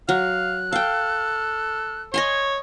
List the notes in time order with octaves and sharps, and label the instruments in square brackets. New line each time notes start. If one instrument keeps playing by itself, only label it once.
[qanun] F#3 [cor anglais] F5 [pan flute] F#6
[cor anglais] A4 [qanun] F5 G5
[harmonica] C#5 [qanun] D#5 G#5 C6